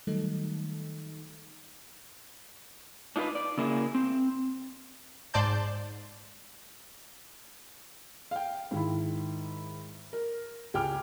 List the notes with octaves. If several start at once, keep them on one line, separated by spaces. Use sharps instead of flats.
D#3 F#3 G3 A3 D#4 A4
D4 D#4 F4 A#4 B4
D5
C#3 A#3 E4 G#4
C4
G#2 C5 D5 A5 G6
F5 G5
G#2 D#3 E4
A#4
C#2 G4 G5 G#5 D6 F6